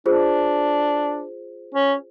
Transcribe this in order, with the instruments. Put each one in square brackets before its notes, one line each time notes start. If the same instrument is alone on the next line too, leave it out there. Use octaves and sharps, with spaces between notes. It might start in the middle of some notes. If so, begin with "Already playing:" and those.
[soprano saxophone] D4 [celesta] F4 G#4 C5
[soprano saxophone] C#4